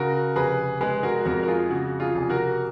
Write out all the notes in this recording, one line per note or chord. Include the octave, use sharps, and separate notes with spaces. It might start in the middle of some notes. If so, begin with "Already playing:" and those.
Already playing: C#3 F#4 A#4
F1 G#4 B4
G#3 G#4 B4
F#4 A#4
F2 F#4 A#4
A#4
F4 G#4
C#3 F#4
F4 G#4
F1
F#4 A#4